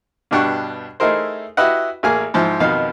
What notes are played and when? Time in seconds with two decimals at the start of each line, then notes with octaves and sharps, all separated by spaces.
0.31 G2 B2 D4 G4 F#5 C#6
1.00 A3 D#4 E4 G#4 A#4 C5
1.57 E4 F#4 G4 B4 D#5 F#5
2.03 A1 A#3 G#4 G#5 F6
2.34 G#2 F3 E4
2.60 F2 B2 D#3 D#4 F5